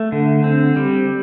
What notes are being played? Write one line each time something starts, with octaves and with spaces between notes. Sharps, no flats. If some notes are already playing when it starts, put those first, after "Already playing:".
Already playing: A3
D3
C4
G3